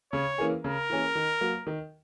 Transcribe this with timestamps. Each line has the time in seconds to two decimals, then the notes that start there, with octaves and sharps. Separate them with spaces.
0.13 C#3 C#5
0.38 E3 A#3 C#4 G#4
0.64 C#3 A#4
0.90 E3 A#3 C#4 G#4
1.15 D#3
1.41 F#3 A#3
1.67 D#3